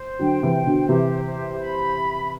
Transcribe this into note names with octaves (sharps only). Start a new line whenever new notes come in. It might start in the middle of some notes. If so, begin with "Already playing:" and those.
Already playing: C5
D3 F#3 G5
C3 E3
C5
B2 D3
C3 E3 G4
C5
B5